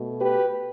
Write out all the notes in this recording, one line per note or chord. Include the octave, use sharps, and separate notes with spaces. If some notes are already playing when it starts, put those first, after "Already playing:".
Already playing: B2 A3
G4 B4